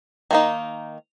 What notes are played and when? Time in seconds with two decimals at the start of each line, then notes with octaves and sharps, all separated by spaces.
0.31 D#3 A#3 D#4